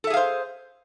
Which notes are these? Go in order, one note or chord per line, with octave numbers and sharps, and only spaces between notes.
G#4 A4 C5 E5 F5